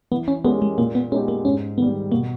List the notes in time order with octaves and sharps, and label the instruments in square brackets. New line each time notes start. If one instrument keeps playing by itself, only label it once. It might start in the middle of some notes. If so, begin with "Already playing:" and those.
[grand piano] E3 [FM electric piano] B3
[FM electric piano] C#4
[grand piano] G#3 C#4 G4 A#4 [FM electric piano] B3
[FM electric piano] G#3
[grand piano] A#2 [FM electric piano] A#3
[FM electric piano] B3
[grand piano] G#3 B3 D#4 G4 [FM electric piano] C#4
[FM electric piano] A#3
[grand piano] G#2 [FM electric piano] C#4
[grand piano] D#3 G3 [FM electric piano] B3
[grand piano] B2 [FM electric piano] A#3